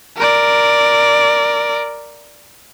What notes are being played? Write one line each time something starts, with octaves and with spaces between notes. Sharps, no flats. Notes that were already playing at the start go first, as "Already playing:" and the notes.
A#4 D5